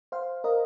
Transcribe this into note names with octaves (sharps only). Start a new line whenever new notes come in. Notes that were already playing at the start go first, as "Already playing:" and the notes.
C5 F5
A#4 D#5